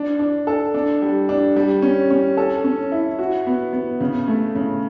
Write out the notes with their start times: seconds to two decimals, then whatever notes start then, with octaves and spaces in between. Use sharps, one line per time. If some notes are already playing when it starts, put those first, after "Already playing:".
Already playing: D4
0.19 D4
0.47 A4
0.74 D4
1.02 G3
1.29 D4
1.56 G3
1.82 C#4
2.11 C#4
2.37 A4
2.64 C#4
2.92 E4
3.19 F#4
3.46 B3
3.73 B3
4.00 C#3
4.28 A3
4.55 C#3